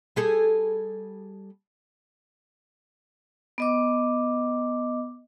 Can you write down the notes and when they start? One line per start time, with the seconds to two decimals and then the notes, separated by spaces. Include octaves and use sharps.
0.16 G3 G#4 A4
3.58 B3 D#5 D6